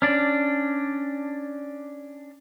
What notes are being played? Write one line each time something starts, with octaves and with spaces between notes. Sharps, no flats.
C#4 D4 D5